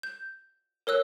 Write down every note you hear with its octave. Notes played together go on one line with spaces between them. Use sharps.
G6
A#4 C#5 E6 F#6